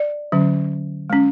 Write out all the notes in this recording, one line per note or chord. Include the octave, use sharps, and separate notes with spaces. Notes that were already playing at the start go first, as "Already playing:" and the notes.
Already playing: D5
D3 F#3 C#4
G#3 C#4